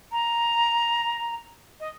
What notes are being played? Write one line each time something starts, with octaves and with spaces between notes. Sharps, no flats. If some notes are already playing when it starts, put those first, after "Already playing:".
A#5
D#5